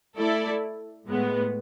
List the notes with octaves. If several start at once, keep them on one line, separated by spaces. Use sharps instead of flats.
A3 E4 A4 D5
A2 G#3 B3